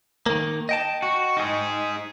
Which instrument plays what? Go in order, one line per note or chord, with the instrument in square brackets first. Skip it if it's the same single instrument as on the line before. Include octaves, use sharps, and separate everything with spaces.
[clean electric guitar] D#3 A#3
D#5 G5 A5
[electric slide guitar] F#4
D#4 G#4